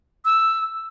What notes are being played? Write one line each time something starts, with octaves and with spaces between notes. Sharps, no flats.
E6